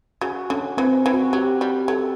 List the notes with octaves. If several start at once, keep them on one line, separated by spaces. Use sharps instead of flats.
C#3 F#4
D3 C#4
E3 C4
E3
F#4
F#3 G4
G3
F#3 A4